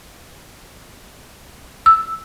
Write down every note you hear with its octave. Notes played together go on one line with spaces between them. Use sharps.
E6